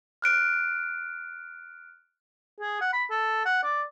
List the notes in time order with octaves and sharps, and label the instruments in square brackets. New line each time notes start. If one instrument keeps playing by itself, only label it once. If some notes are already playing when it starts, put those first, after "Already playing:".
[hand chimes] F6 F#6 D7
[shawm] G#4
F#5
B5
A4
F#5
D5